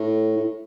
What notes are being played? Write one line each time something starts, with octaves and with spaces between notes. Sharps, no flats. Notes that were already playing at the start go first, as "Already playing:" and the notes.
Already playing: A2
A2